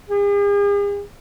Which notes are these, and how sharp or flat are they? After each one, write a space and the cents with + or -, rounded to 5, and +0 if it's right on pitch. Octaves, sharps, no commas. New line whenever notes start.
G#4 -45